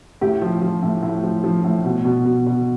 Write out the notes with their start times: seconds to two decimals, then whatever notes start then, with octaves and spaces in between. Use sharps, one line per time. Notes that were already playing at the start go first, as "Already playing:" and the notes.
0.21 A2 G4
0.42 F3
0.62 F3
0.83 A2
1.03 A2
1.24 F3
1.44 F3
1.64 A2
1.85 B2
2.05 B2
2.25 B2
2.47 B2